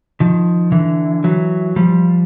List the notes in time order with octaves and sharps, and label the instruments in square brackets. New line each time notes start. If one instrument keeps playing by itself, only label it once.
[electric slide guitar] D#3 F3
D3 E3
E3 F#3
F3 G3